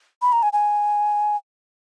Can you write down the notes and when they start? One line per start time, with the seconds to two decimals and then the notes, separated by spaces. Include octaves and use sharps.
0.22 B5
0.32 A#5
0.43 G#5
0.53 G#5